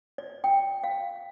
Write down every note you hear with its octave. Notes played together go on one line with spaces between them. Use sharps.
D5
G5
F5